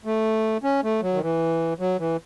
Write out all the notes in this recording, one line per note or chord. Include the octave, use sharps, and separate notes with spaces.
A3
C#4
A3
F#3
D#3
E3
F#3
E3